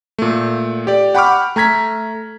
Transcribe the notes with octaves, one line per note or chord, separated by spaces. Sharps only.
A#2 A3
G4 D5
F#5 G5 B5 C#6 D6 F6
A3 A#5 G#6 B6